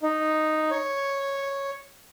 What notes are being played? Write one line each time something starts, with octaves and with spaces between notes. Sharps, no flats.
D#4
C#5